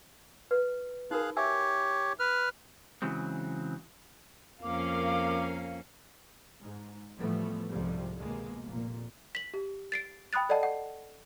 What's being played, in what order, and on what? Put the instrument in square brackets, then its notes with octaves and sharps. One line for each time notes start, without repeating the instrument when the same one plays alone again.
[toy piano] B4
[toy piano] D#4 F#4 A#4 [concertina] G#4 F5 F#6
[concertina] G4 C#5 [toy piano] E5 G#5 E6
[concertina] B4 F6
[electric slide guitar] C#3 E3 F#3 G#3 C4
[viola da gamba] F2 A#3 C#4 [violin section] A#4 F5 [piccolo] D6
[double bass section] G#2
A2 E3 F3 G3 A3 B3
C2 F2 G#2 C3 F3 G3
D#2 B2 G#3 A#3
F1 A#2
[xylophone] B6 F#7
G4
A6 C7 D7
G5 B5 D#6 F#6 A6
A4 D5 D#5 F#5 A5
F#5